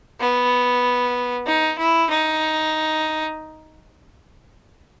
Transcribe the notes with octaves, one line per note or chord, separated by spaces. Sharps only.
B3
D#4
E4
D#4